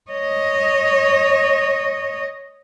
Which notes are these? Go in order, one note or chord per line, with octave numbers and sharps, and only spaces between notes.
C#5 D#5